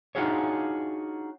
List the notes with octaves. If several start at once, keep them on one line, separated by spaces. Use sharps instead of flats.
D4 D#4 F4 F#4 G#4 C#5